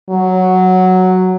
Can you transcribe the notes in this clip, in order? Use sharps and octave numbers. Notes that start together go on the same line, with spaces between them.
F#3